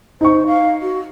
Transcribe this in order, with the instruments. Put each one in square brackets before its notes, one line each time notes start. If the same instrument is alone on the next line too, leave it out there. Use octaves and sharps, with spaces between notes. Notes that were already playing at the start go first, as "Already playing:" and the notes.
[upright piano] D#4 C#6 [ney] C5
[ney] F5
F#4